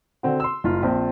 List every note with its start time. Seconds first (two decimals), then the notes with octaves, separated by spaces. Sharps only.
0.23 D3 C4 F#4
0.40 C6 E6
0.64 F#1 F4
0.83 A#1 C4